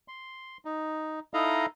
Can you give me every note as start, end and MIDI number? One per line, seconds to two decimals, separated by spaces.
0.08 0.57 84
0.65 1.20 63
1.34 1.66 63
1.34 1.66 64
1.34 1.66 69
1.34 1.66 75
1.34 1.66 77
1.34 1.66 82